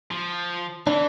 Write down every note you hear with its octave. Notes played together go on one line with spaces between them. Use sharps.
F3
E3 D4